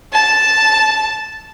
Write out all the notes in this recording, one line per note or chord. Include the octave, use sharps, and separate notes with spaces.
A5